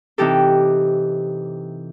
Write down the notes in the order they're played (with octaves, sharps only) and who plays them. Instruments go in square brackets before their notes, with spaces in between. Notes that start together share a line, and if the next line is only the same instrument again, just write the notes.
[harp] C3 E3 D#4 G4 A4